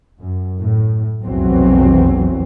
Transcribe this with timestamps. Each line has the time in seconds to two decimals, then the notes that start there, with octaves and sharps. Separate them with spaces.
0.22 F#2
0.61 A2
1.24 F1 B1 E2 E3 F#3 C4